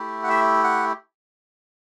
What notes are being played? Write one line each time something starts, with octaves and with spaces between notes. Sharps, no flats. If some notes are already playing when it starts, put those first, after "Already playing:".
Already playing: A3 E4 G4
F#5
E5
F#5